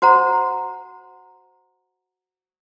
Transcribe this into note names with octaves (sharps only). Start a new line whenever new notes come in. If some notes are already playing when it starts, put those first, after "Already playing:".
F#4 C5 F#5 A#5